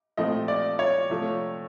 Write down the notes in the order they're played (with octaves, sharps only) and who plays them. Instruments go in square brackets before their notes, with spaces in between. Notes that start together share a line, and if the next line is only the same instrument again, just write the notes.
[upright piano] A#2 F3 A3 C4 D#5
D5
C#5
C3 F3 A3